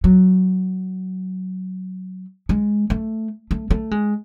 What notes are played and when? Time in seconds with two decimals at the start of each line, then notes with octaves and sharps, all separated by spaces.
0.04 F#3
2.49 G#3
2.90 A3
3.51 A3
3.71 A3
3.91 G#3